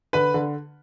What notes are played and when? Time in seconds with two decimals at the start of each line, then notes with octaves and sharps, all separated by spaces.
0.13 D3 B4 B5
0.34 D3